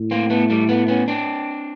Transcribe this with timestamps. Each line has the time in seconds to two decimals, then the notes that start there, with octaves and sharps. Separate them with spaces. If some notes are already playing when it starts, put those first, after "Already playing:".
Already playing: A2
0.11 A#3 C4
0.30 A3 B3
0.50 G3 A3
0.69 A3 B3
0.88 B3 C#4
1.08 C4 D4